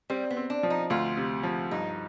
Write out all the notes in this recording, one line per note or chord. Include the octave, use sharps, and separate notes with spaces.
G3 C4
B3
C4
D4
F3
D#4
D2 F4
C3
F3
G2 D#4